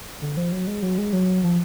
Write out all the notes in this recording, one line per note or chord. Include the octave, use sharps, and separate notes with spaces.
D3
F3
F#3
G#3
F#3
G#3
F#3
F3